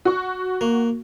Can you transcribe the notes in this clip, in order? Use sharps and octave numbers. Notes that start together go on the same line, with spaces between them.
F#4 C#6
A#3